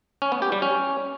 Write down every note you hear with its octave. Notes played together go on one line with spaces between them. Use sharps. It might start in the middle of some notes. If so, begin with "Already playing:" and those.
C#4
B3
G4
G3
C#4